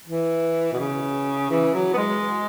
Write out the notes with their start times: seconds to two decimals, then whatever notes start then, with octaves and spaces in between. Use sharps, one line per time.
0.08 E3
0.73 B2
0.79 C#3
1.50 E3
1.74 F#3
1.93 B3
1.97 G#3